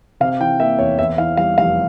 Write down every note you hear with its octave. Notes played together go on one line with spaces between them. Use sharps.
C3 F5
E3 G5
A#3 E5
E2 C#5
E2 E5
E3 F5
G3 F5
F1 F5